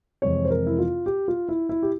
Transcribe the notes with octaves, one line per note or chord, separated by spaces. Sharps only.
F2 C3 E3 G#3 C4 C#5
C5
A#4
E4
F4
G4
F4
E4
E4
G4